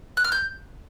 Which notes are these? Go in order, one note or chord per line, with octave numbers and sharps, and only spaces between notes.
F#6
F6
G6